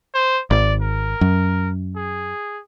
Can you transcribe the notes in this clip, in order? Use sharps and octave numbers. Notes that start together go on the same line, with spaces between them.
C5
G#1 D5
A#4
F#2
G#4